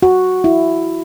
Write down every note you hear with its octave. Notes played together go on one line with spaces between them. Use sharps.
F#4
E4